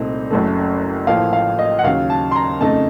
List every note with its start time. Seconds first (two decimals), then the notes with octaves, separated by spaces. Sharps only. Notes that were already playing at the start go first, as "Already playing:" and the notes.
Already playing: C2 A#2 A3 C4 D#4
0.31 F#1 F#2 C#3 A3
1.07 A1 A2 F3 A#3 F5
1.33 F5
1.59 D#5
1.79 F#5
1.84 D#2 C#3 F#3 F5
2.10 A5
2.31 C6
2.36 A#5
2.60 F2 C#3 A3 D#4 A5